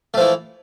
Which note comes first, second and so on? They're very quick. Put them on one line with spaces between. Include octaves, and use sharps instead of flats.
A3 F3 E3